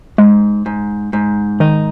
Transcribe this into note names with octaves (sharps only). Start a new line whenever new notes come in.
G#2 G#3
G#2
G#2
D#3 D#4